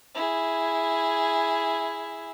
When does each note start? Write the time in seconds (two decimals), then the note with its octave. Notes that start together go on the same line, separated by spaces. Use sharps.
0.15 E4 G#4